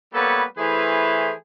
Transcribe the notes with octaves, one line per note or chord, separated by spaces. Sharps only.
G3 A#3 B3 A4 B4 C#5
E3 A3 E4 G#4 B4 C5